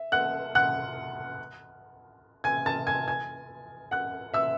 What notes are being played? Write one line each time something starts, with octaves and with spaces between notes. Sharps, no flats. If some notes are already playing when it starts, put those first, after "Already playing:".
Already playing: E5
F#5 F#6
F#5 F#6
G#5 G#6
A5 A6
G#5 G#6
G#5 G#6
F#5 F#6
E5 E6